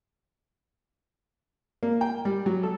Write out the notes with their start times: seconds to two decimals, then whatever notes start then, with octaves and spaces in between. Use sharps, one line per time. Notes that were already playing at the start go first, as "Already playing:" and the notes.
1.83 A#3
2.01 G5
2.25 G3
2.46 F#3
2.63 A4